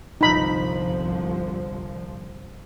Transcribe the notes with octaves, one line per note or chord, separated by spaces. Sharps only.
G1 C2 F3 D#4 B5